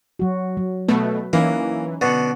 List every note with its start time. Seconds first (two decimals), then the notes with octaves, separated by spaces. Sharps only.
0.19 F#3 F#4
0.57 F#3
0.88 B2 A3 B4
1.33 E3 A#3 C#4 D#4
2.01 B2 D3 F#5